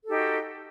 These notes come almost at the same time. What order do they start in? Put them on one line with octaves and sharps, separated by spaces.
A4 G4 D#4 F#4